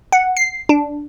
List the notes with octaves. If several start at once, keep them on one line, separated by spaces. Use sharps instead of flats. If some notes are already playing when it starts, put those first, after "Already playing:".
F#5
C7
D4